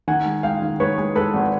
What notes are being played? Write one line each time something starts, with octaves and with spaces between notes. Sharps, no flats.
D#3 F#5 G#5
G#3
G#3 F5 G5
D#3
G#3 B4 C#5
G#3
G#3 A4 B4
G#1